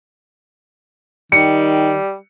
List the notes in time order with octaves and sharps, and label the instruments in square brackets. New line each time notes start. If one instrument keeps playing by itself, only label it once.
[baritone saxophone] D#3 [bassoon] G3 [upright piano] C#7